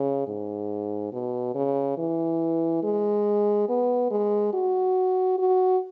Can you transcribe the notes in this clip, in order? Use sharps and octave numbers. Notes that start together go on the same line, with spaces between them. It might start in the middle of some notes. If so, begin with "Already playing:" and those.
Already playing: C#3
G#2
B2
C#3
E3
G#3
B3
G#3
F#4
F#4